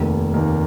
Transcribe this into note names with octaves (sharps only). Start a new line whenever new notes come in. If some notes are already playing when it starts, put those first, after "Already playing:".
Already playing: F1 D#2 D#3 A#3
F1 D#2 D#3 A#3